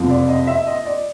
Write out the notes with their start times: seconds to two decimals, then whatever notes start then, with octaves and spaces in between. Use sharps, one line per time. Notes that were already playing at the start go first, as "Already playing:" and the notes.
Already playing: F#1 F2 C3
0.09 D5
0.28 D#5
0.47 E5
0.67 D#5
0.85 D5